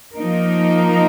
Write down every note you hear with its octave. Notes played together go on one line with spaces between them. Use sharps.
F3 A#3 D#4 A#4